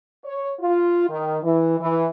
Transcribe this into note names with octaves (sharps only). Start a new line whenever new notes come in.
C#5
F4
D#3
E3
E3